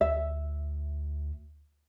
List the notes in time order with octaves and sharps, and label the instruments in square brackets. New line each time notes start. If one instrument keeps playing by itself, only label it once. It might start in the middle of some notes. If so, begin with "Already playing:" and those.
[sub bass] D2 [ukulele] E5